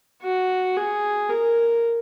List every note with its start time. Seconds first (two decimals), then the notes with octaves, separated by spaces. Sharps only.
0.22 F#4
0.76 G#4
1.29 A#4